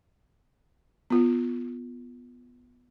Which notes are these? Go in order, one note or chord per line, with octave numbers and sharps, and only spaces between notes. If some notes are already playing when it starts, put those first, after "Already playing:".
B3 F4